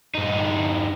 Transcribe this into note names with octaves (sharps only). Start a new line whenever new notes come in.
G2 D#4